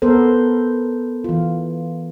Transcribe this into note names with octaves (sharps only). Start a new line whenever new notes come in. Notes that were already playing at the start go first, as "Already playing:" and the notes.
B3 A4 A#4 C5
E3 F4